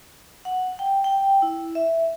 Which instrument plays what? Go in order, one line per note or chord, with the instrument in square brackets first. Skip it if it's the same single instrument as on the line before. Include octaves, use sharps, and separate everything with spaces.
[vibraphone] F#5
G5
G5
E4
E5